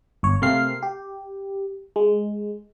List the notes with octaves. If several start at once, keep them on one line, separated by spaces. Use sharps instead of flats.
G1 C#5
C3 A3 A#3 C4 F5 C7
G4
G#3